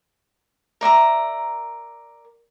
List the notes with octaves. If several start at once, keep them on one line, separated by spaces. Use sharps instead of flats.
A#4 D5 E5 A#5